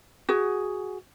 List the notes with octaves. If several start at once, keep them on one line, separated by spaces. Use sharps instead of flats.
F#4 G#4